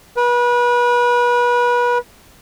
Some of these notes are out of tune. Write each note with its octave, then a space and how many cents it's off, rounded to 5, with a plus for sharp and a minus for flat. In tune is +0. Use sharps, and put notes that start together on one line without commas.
B4 -30